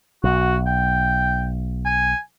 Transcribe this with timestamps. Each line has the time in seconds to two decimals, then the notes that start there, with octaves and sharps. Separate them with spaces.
0.24 B1 F#4
0.67 G5
1.86 G#5